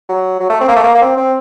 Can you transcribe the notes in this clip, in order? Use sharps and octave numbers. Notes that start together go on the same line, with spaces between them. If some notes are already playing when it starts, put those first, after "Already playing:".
F#3
F#3
A3
C4
A#3
A3
A#3
A#3
C4
C4